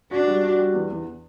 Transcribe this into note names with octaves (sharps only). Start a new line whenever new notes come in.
D4 F#4
G3
F#4
G3
E2
E2